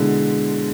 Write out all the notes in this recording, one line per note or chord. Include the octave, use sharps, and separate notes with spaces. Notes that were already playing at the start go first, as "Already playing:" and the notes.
Already playing: B2 D3 G#3 B3 E4